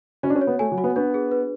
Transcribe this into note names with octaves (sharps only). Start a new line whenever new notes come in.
C#4 F#4
D4
C#4
C#5
B3
A3 G#5
F#3
F#4
B3
B3 D4
G#4
B4